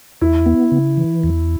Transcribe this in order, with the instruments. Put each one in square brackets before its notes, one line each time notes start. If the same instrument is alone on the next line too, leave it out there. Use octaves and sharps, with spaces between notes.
[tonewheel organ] E2 [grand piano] E4
[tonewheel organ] B3
C#3
E3
E2